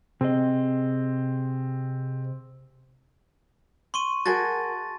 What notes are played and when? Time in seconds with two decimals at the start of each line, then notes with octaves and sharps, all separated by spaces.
0.21 C3 C4 G#4 D#5
3.94 C6 C#6 D#7
4.26 F#4 G#4 A#4 A5 A6 A#6